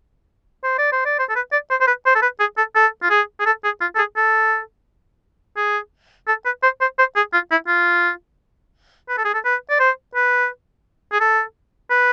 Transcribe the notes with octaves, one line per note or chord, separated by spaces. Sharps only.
C5
D5
C5
D5
C5
A4
B4
D5
C5
C5
B4
C5
A4
B4
G#4
A4
A4
F4
G#4
G#4
A4
G#4
F4
A4
G#4
A4
G#4
A4
B4
C5
C5
C5
G#4
F4
E4
F4
B4
A4
G#4
A4
B4
D5
C5
B4
G#4
A4
B4